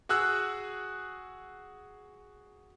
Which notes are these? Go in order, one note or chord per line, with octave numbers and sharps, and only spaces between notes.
F#4 G#4 E6 F#6